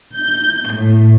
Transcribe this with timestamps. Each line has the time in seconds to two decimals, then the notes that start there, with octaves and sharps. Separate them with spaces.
0.14 G6
0.73 A2